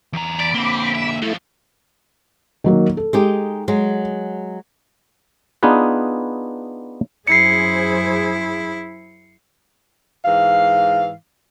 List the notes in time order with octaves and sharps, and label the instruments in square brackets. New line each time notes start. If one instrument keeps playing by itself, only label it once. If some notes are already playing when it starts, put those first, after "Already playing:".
[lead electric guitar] E2 A#5
[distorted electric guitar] D5 [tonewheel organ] B5 D6
[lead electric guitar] D3 A#3 [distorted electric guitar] C4
[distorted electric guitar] E5
[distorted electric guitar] A2 F3 [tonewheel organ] A3 E4
[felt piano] D#3 F#3 A#3
A4
[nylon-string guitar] G#3 D#4 G4
F#3 G#3
[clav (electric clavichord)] B3 D4 D#4 F4 G#4 B4
[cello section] F#2 G#4 C5 [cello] E4 [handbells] C7 C#7
[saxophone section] G#2 E3 F5